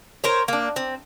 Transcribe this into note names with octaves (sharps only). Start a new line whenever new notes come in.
A#4 C5 C#5
A#3 D4
C4